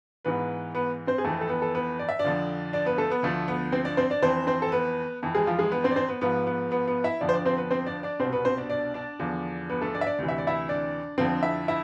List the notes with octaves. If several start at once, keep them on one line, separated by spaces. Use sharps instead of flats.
G#2 E3 B3 B4
B3 B4
C4 C5
G#4
F2 E3 A3 A4
A4
B3 B4
A4
B3 B4
D5
E5
D4 D5
F2 D3 F3
D4 D5
B3 B4
A3 A4
B3 B4
D2 D3 F3 A3 A4
B3 B4
C4 C5
D4 D5
C4 C5
D4 D5
F2 E3 C4 C5
C4 C5
A4
B3 B4
F2 E3
G#3 G#4
F3 F4
G#3 G#4
B3 B4
C4 C5
D5
C4 C5
B3 B4
G#2 F3 B3 B4
B3 B4
B3 B4
B3 B4
E4 E5
F2 D3 F3 D4 D5
C5
D4 D5
C4 C5
B3 B4
C4 C5
D4 D5
D4 D5
C2 C4 C5
B2
B3 B4
C4 C5
D4 D5
D4 D5
D4 D5
E2 D3 F3
B3 B4
A3 A4
D4 D5
E5
D4 D5
D2 C3 E3
E5
D5
E4 E5
D4 D5
F2 D3 F3 C4 C5
E4 E5
E4 E5